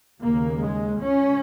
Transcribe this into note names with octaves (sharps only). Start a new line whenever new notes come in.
D#2 C#3 A#3
G#3
C#2 C#3 C#4